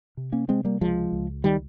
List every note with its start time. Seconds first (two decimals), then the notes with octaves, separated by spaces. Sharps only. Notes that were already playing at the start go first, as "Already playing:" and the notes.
0.17 C3
0.32 A#3 C#4
0.48 C3 G#3 C4
0.65 G3 A#3
0.81 C#2 F3 G#3
1.12 C#2
1.44 D#3 G3